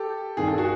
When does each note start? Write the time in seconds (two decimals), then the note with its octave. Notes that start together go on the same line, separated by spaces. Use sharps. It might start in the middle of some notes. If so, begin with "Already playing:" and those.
Already playing: G4 A4
0.37 G2 D#3 G#4
0.48 A4
0.58 F#4 G#4